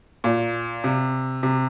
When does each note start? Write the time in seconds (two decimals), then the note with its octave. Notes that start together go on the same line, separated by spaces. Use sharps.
0.24 A#2
0.84 C3
1.43 C3